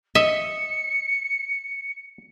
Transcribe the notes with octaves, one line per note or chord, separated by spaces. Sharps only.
D#5 E5 C#7